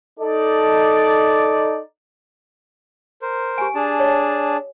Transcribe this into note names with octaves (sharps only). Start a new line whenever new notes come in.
D#4 A4 D5
A#4 C5
G4 G#5
D4 G#4 A5
C#5 D#5